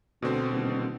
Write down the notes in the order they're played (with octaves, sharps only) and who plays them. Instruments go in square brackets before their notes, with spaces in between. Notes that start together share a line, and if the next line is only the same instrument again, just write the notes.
[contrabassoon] D2 [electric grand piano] B2 D3 C4
[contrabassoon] D#1